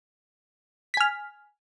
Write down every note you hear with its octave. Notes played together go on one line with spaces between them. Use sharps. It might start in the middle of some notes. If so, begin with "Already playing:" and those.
G#5 F6 B6